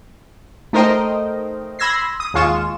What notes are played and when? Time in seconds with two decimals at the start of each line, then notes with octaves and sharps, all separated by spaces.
0.73 A3 D#4 A#4 C5 D#5 G5
1.79 B5 C6 E6 G#6 A#6 C7
2.20 D#6
2.34 D#2 G#3 F4 C#6 E7